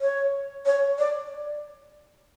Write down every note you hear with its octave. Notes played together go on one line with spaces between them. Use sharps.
C#5
C#5
D5